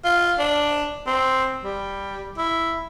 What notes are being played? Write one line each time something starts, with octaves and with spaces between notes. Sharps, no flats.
F4
D4
C4
G3
E4